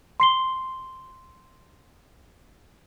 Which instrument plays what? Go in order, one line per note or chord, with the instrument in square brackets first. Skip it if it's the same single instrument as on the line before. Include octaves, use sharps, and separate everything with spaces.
[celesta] C6 C7 G7